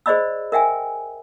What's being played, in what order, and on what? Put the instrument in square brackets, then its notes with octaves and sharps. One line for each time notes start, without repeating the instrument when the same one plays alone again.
[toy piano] G#4 C5 D5 D#5 B5 E6
A#4 E5 G5 G#5